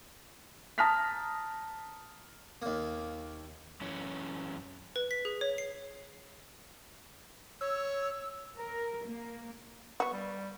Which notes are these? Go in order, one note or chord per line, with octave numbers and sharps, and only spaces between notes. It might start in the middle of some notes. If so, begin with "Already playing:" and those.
A5 A#5 D#6 F6 A#6 B6
D#2 A#3
F#2 E3 C#4
B4
B6
G#4
C#5
C7
C#5 E6
A#4
A#3
B3 F#4 C#6
G3